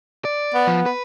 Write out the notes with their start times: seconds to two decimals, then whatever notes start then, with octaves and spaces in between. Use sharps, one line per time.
0.25 D5
0.54 B3
0.67 F3
0.86 B4